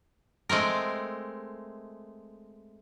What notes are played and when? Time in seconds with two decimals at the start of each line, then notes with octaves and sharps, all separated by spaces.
0.49 G#3 A3 C4 A#4